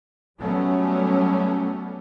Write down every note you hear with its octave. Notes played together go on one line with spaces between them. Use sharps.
F#3 G3 A3 B3 C#4